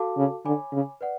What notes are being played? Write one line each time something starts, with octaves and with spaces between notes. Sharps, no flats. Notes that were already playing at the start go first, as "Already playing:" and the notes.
Already playing: F#4 A4 F5 A5 D6
C#3
D3 C#5 G#5 B5 D6
C#3
B4 D5 F#5